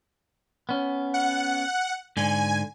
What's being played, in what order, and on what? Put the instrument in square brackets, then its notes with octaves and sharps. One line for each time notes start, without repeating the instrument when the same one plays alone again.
[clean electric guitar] B3 C#4
[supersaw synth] F#5
[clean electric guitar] G#2 D3 [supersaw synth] G#5